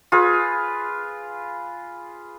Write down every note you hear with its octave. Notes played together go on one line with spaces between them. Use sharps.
F4 G#4 B4